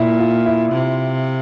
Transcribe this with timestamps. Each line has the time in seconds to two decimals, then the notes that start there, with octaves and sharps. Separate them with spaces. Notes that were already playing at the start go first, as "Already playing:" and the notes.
Already playing: A#2 E4
0.19 F4
0.46 E4
0.72 C3